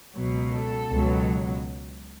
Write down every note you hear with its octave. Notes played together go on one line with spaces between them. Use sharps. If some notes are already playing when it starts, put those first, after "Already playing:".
C#2 B2 F#3
A4
C#2 B2 F#3